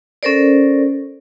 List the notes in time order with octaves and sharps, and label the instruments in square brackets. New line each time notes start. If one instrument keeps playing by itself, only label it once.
[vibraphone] C#4 A4 A#4 C5 D5